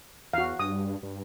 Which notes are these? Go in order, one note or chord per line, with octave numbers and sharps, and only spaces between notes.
E2 F#4 F5
G2 D#6
G2